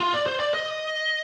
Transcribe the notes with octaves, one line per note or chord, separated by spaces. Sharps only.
F4
D5
C5
D5
D#5